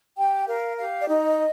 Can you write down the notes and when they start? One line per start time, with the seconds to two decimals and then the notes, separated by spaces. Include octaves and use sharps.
0.17 G4 G5
0.47 A#4 F5
0.78 G4 F5
1.01 D5
1.08 D#4 D#5